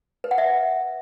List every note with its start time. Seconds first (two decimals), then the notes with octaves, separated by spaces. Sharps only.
0.24 B4
0.31 F#5
0.38 E5